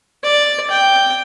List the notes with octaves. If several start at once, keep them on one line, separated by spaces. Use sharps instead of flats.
D5
G5